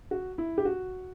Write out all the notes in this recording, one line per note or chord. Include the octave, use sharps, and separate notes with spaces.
F#4
E4
G4
F#4